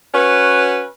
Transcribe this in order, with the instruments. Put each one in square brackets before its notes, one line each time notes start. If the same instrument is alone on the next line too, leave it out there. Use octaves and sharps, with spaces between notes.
[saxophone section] C#4 F#4 B4